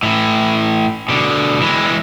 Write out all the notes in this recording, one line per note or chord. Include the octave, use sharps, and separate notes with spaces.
A2 E3
B2 D3
E3 G#3